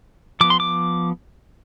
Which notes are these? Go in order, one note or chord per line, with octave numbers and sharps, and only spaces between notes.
F3 B3 D6
C6
D6